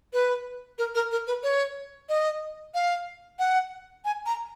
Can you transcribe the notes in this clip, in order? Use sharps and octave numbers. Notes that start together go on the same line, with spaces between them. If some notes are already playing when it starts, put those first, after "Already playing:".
B4
A#4
A#4
A#4
B4
C#5
D#5
F5
F#5
G#5
A#5